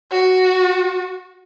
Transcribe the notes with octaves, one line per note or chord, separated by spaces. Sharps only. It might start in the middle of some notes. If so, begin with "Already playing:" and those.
F#4